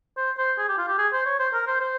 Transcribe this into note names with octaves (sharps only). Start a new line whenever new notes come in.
C5
C5
G#4
G4
F4
G4
G#4
C5
C#5
C5
A#4
C5
C5